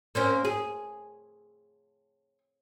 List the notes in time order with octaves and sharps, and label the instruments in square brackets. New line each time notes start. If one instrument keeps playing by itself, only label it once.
[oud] A#3 C4 C#4
G#4